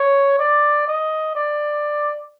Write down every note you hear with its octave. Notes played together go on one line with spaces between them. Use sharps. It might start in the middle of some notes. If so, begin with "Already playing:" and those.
Already playing: C#5
D5
D#5
D5